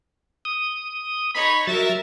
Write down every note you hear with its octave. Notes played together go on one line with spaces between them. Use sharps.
D#6
D#4 C#5 B5
F#3 A#4 E5 A6